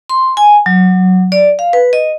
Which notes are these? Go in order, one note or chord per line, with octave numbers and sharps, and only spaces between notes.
C6
G#5
F#3
D5
F5
B4
D#5